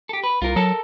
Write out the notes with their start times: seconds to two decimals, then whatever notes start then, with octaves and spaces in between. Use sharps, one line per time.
0.09 G4 A4
0.24 B4
0.42 C2 F4 A#4
0.56 F#3 A4 A#4 A5